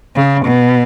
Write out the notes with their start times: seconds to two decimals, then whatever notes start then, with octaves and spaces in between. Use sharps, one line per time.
0.16 C#3
0.45 B2